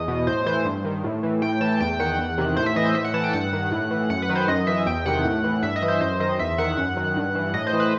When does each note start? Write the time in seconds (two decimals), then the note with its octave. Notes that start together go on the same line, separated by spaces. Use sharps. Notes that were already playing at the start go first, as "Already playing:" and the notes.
Already playing: E2 D#5
0.08 B2
0.27 A2 C5
0.46 E3 C5
0.65 G2
0.85 D#3
1.04 A2
1.23 E3
1.42 A2 G5
1.61 E3 A5
1.80 E2 G5
1.99 D#3 F#5
2.19 E2
2.38 C3 D#3
2.57 A2 C5
2.66 E5
2.76 E3 D#5
2.85 C5
2.95 A2 E5
3.04 F#5
3.14 E3 A5
3.24 G5
3.33 G2 F#5
3.53 D#3
3.71 A2
3.91 E3
4.10 F#2 F#5
4.22 B4
4.29 D#3
4.35 C5
4.48 F#2 D#5
4.67 E3 E5
4.86 E2 G5
5.05 C3 D#3 F#5
5.24 A2
5.44 E3
5.63 G2 E5
5.76 D#5
5.82 E3
5.88 C5
6.01 F#2 C5
6.20 D#3 D#5
6.39 E2 E5
6.58 D#3 F#5
6.77 F#2
6.97 D#3
7.16 G2
7.35 E3
7.54 A2 D#5
7.67 C5
7.73 E3
7.80 B4